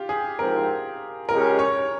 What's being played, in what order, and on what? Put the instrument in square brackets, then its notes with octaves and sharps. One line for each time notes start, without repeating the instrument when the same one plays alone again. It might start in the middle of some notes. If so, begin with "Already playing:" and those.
Already playing: [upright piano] F4 G4
G#4
[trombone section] G#2 F3 C4 [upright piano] A#4
[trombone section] C#2 C#3 G#3 C#4 G4 [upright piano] A#4
[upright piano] C#5